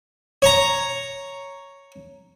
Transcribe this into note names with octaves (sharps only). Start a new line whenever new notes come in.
C#5 A#5